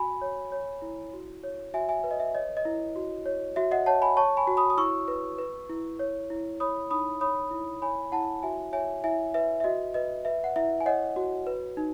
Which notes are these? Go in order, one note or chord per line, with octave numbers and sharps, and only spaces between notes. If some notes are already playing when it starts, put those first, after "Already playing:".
Already playing: F#4 G#5 B5
C#5
C#5
E4
F#4
C#5
F#4 E5 G#5
E5 G#5
B4
D#5
E5
C#5 D#5
D#5
E4
F#4
C#5
F#4 E5
D#5 F#5
C#5 F#5 A5
G#5 B5
C#5 A5 C#6
G#5 B5
F#4
B5 D#6
D#6
E4 C#6 E6
B4
B4
E4
C#5
E4
C#5 B5 D#6
D#4 B5 D#6
C#5 B5 D#6
E4
C#5 G#5 B5
E4 F#5 A5
F#4 E5 G#5
C#5 E5 G#5
E4 E5 G#5
B4 E5
E5
F#4 D#5
B4 D#5
B4 E5
F#5
E4 E5
G#5
C#5 D#5 F#5
F#4
B4
D#4